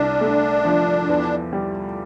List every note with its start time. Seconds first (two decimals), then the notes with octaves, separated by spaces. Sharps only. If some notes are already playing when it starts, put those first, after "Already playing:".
Already playing: C2 D4
0.21 A3
0.65 F3
1.09 E2
1.53 G3